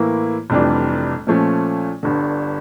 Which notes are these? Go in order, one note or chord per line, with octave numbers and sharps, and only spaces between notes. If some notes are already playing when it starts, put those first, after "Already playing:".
Already playing: A2 E3 A#3 E4
F1 F2 E3 G3 D4
A#2 F3 A3 C#4
G1 G2 D3